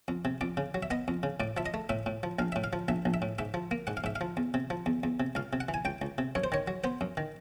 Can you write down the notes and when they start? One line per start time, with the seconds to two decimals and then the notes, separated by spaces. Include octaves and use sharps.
0.08 F2
0.25 C3
0.41 F2 D5
0.57 C#3
0.74 F#3
0.83 E5
0.91 B3 D#5
1.08 F2
1.23 C#3
1.40 A2 D5
1.57 F3 E5
1.66 D#5
1.74 A3
1.89 A2 E5
2.06 A2
2.23 F3
2.39 A#1 F5
2.52 A2 E5
2.64 F5
2.73 F3
2.88 A#1 E5
3.05 A#1
3.14 E5
3.22 A2
3.39 G#2 E5
3.54 F3
3.71 A#3
3.87 G#2 F#5
3.97 F5
4.04 G#2 E5
4.16 F5
4.21 F3
4.37 E2
4.54 C3
4.70 F3
4.86 E2
5.03 E2
5.20 C3
5.35 C#2 F5
5.53 C3
5.60 F#5
5.69 E3
5.74 G#5
5.85 C#2 G5
6.02 C#2
6.18 C3
6.35 F#2 C#5
6.44 C5
6.52 D#3 C#5
6.68 F#3
6.84 B3 C5
7.01 F#2
7.17 D#3